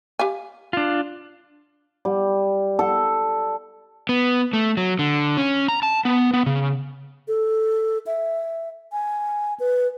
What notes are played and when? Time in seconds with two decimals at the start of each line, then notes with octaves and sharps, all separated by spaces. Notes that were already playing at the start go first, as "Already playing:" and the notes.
0.19 G4 F5 G#5
0.73 D4 F4
2.05 G3
2.79 A4
4.09 B3
4.53 A3
4.77 F#3
4.99 D3
5.37 C#4
5.68 A#5
5.83 A5
6.05 B3
6.34 B3
6.46 C#3
7.28 A4
8.07 E5
8.92 G#5
9.60 B4